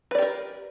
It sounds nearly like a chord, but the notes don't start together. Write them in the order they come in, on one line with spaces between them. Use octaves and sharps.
B4 D5 G4 A#4